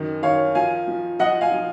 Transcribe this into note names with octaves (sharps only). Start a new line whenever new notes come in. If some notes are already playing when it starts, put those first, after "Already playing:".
Already playing: F#2 D#3
D#3 C#5 F5
F3 F5 G#5
F3
F3 D#5 F#5
F5 G#5
F3